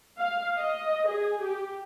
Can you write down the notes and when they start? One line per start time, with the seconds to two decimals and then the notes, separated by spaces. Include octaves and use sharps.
0.19 F5
0.58 D#5
1.08 G#4
1.41 G4